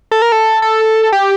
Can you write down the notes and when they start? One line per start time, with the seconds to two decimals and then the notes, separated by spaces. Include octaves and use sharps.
0.11 A4
0.22 A#4
0.32 A4
0.62 A4
1.12 G4